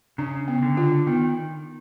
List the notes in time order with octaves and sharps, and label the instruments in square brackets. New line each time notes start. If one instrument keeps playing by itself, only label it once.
[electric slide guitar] C#3 [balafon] D4
[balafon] B3
[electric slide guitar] D3
[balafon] F4
[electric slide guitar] D#3 [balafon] B3